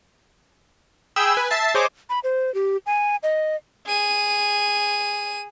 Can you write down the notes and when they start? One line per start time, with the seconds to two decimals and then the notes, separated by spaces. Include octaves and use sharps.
1.16 G#4 G5 B5 E6
1.35 B4 G#5
1.50 E5 A5 A6 C7
1.75 G#4 C5 C#5 D#5 D6
2.10 B5
2.24 C5
2.55 G4
2.86 G#5
3.23 D#5
3.87 G#4 D#7